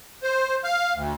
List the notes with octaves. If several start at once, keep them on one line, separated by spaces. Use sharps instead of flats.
C5
F5
D2